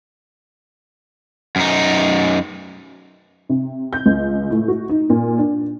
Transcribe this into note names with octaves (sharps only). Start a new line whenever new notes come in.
F#2 D#4
C3
G6
C#2
A2
F#4
D#4
A#2
D4